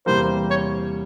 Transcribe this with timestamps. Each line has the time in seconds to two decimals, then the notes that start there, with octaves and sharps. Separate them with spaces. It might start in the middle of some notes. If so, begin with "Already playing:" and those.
0.06 E2 C3 E3 G3 A#3 C5
0.50 C#5